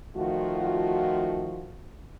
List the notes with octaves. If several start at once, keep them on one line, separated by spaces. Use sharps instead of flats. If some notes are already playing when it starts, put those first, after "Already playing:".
D#3 F3 A3 F4 F#4